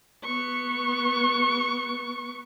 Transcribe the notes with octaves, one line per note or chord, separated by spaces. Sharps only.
B3 C#6